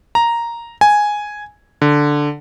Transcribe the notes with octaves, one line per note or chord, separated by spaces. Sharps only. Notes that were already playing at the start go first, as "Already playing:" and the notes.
A#5
G#5
D3